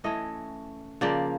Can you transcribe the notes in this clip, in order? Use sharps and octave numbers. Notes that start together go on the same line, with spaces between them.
E3 A3 C#4 D#5
C#3 F3 A#3 D5